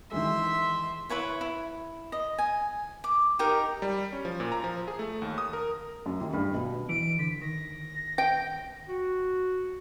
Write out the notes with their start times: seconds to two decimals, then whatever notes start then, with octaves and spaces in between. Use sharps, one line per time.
0.12 D#3 E3 G#3 E5 C6
1.10 E4 B4 C#5 E5
1.41 E4
2.12 D#5
2.38 G#5
3.04 D6
3.39 D#4 G4 A#4 G5
3.82 G3
4.13 C#4
4.25 F3
4.40 A#2
4.52 A#5
4.64 F3
4.88 G#4
4.99 A3
5.22 D#2
5.38 D#6
5.53 A#4
6.06 F#2
6.21 D#2
6.33 G2
6.54 B2
6.89 E3 D7
7.19 D3 B6
7.41 D#3 A#6
8.18 G5
8.88 F#4